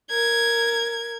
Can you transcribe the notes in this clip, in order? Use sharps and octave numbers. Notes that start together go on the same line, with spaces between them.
A#4 G#6